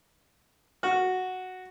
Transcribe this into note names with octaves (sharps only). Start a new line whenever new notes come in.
F#4